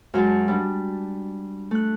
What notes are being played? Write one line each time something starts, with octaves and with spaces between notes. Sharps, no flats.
F#2 F#3 G#3 A5
G3 D4
A3 F#6